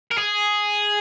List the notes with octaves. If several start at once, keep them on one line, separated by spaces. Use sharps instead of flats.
A#4
G#4